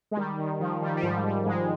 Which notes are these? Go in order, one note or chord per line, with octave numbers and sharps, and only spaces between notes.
G#3
D#3 G3
D#3
D#3 F3
D#3 G3
G3
G#2 F3
G#2 G3
G#2 G#3